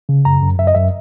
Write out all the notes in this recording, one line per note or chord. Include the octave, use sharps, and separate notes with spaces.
C#3
F#2 A#5
F#2
F#2 E5
D#5
F#2 E5